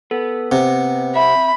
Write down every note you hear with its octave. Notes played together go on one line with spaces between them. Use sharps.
B3 A4
C3 F#5
C4 E5 B5